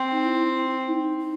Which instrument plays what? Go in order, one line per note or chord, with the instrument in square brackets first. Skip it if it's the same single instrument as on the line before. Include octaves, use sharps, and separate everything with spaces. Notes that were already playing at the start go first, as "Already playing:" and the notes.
Already playing: [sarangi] C4
[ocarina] D#4
E4
E4
D#4
D#4